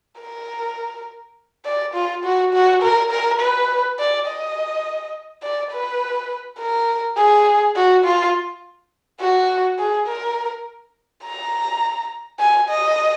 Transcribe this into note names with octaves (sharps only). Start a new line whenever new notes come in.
A#4
D5
F4
F#4
F#4
A#4
A#4
B4
D5
D#5
D5
B4
A#4
G#4
F#4
F4
F#4
G#4
A#4
A#5
G#5
D#5